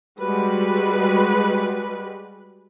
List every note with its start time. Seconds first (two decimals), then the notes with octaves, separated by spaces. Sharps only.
0.19 G3 G#3 F#4 B4